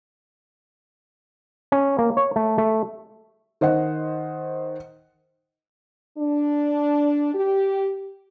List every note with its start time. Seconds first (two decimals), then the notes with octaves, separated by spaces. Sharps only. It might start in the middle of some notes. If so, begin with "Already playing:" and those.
1.72 C#4
1.99 A#3
2.17 C#5
2.36 A3
2.58 A3
3.61 D#3 C5 D#5 F#5
6.18 D4
7.34 G4